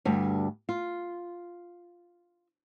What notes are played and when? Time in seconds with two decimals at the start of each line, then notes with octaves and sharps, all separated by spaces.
0.05 D2 G2
0.69 F4